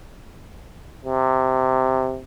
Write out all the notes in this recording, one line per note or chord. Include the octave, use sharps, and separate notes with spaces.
C3